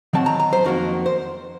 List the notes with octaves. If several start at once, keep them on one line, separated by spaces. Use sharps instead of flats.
D#3 F#3 C4 A5
A#5
A#5
C5
F2 D#3 A#3 F#4
C5